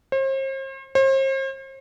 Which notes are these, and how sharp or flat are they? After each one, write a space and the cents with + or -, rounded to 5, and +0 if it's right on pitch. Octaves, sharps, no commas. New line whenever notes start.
C5 +40
C5 +40